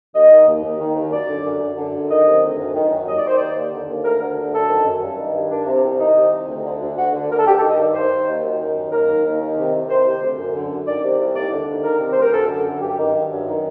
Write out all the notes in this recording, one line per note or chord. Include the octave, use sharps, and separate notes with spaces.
D#2 D#5
D#3
D#2
D#2
D#3
D#2
F#2 D5
D3
F#2
F#2
D3
F#2
D#3 D#5
C3
D2
F#2
D#3
F#2
D#2 D#5
D5
D#3 C5
D#2 D5
D#2
D3
D#2
D2 A#4
D3
D2
F#2 A4
D#3
F#2
G2
D#3
G2
D#3 D4
C3
C2
D#3 D#4
C3
C2
D2
D3
D2
D2 F#4
D3
D2 A#4
A4
G2 G4
A4
D#3
D#5
G2 D5
D#2 C5
D#3
D#2
F#2
D#3
F#2
D#2 A#4
D#3
D#2
D#3
C3
C2
D#3 C5
C3
D2
F#2
D3
F#2
D#3 D5
C3
C2
D#2 D5
D3
D#2
D#3 A#4
C3
D2 C5
A#4
F#2 A4
D3
F#2
G2 G4
D#3
G2
F#2
D#3